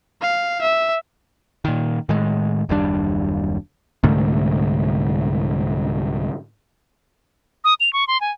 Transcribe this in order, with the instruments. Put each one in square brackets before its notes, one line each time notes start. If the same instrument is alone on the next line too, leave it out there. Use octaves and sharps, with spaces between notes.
[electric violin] F5
E5
[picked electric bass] A#2 D#3
A2 D#3 G#3
F#1 D#2 G3 D4
C2 G#2 D3 A3
[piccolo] D#6
F7
C#6
C6
G#5